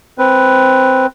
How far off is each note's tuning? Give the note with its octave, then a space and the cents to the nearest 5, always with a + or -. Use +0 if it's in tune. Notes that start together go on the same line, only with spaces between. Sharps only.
C4 +0 B4 +0